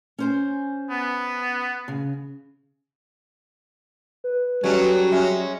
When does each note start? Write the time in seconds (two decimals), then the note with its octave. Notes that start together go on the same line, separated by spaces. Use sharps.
0.19 C#4 C5 G#5
0.90 B3
1.88 C#3
4.24 B4
4.64 F#3 G3 A3 C#4
5.12 G#3 C#4 E5